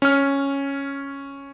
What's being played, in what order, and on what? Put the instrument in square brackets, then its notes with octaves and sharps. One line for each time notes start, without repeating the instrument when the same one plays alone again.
[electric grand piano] C#4 F6